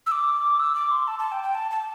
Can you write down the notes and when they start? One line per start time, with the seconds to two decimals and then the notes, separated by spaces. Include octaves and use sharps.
0.06 E6
0.12 D6
0.59 E6
0.75 D6
0.91 C6
1.08 A5
1.19 A5
1.32 G5
1.43 G5
1.55 A5
1.71 A5